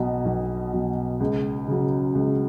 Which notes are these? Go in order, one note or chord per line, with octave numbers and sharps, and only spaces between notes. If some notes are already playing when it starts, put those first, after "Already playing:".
Already playing: B1 B2 F#3
B1
B2 F#3
C#2
C#3 F#3
C#2